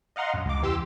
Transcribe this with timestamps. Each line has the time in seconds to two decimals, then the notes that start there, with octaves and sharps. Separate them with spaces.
0.16 D#5 F5 F#5 A#5 C6
0.34 A#1 F#2
0.46 C#2 D6
0.62 E2 E3 G4 C6 E6